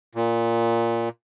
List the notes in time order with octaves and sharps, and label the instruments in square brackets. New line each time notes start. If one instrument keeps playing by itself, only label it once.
[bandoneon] A#2